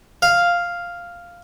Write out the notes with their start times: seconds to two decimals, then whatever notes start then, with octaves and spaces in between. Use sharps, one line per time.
0.22 F5